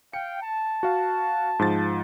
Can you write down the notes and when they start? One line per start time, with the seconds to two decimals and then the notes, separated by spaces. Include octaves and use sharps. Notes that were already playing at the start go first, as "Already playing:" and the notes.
0.13 F5 G5 C#7
0.42 A5
0.83 F#4 F5
1.59 G#2 F3 A6